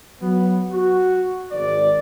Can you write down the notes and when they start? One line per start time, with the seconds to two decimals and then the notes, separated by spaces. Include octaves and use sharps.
0.21 F#3 B3
0.70 F#4
1.52 G#1 D5